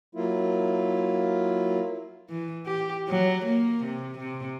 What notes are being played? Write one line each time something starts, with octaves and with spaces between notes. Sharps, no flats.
F#3 A#3 E4 F4
E3
G4
F#3
A#3
C3
C3